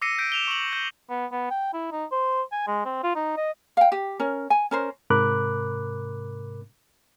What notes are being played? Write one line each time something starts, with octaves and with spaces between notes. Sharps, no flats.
D6 E6 A#6 C7 C#7 D#7
G6 B6 D7
E7 F7 G7
C#6 F#7
G6
B3
B3
G5
E4
D#4
C5
G#5
G#3
C4
F4
D#4
D#5
F5 G5
G4
C#4 A#4
G#5
C#4 A#4 C5
G#2 C3 A#4 B5 D6 F#6